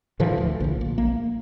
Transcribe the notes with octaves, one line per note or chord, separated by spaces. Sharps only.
A2 D3 E3 F3
D2
A#1 A#2
A#1
A#3